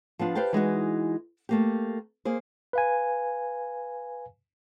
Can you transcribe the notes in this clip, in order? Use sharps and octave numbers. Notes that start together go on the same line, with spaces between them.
F3 B3 D4 F4
G4 B4 C5 F5 G5 A5
E3 G#3 D#4 F#4
A3 A#3 G4
A#3 G#4 C5
B4 F5 G#5